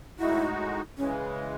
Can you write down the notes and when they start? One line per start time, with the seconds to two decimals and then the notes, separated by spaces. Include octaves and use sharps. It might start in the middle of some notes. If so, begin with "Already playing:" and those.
0.19 A2 G#3 D#4 E4 F#4
0.97 C#3 E3 G#3 C#4